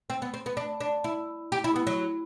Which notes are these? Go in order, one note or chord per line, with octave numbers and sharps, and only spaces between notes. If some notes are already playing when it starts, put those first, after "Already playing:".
C4
B3
C4
B3
D4
D4
E4
G4
E4
B3
F#3